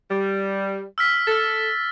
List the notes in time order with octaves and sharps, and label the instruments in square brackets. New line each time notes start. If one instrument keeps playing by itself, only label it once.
[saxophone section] G3
[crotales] E6 F6 B6
[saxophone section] A4 [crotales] F6 A6